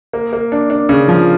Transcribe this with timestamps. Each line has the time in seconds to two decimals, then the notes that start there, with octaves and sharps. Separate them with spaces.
0.13 A#3
0.33 A#3
0.52 D4
0.70 D4
0.89 C#3
1.08 F3